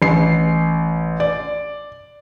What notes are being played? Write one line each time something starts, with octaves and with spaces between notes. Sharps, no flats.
A1 C7
D5